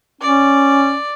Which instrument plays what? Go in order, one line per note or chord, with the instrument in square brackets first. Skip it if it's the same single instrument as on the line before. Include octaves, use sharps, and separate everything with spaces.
[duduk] C#4 [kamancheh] D5